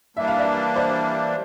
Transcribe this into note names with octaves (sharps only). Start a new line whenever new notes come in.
E3 G3 A#3 D4 E5
F5
D5 E5
C5 D5